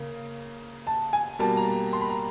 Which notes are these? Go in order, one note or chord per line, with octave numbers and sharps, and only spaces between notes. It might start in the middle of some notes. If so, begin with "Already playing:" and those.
Already playing: C#3 A#3
A5
G#5
B2 G3 A#3 A5
A#5
C6
B5
A#5